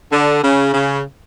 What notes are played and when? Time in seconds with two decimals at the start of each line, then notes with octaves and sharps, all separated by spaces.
0.13 D3
0.43 C#3
0.74 C#3